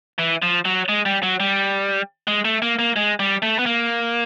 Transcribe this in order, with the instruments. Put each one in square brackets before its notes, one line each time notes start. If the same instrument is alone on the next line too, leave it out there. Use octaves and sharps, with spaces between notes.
[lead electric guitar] E3
F3
F#3
G#3
G3
F#3
G3
G#3
A3
A#3
A#3
G#3
G3
A3
B3
A#3